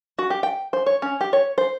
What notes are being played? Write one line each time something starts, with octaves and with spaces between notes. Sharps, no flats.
F#4
G4
G5
C5
C#5
C#4
G4
C#5
C5